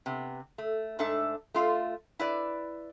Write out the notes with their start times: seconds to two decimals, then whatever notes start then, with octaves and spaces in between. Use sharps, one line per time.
0.06 C3 B3
0.58 A3
0.99 G#2 A3 D4 A4 E5
1.54 A3 F4 F5
2.19 E4 B4 D5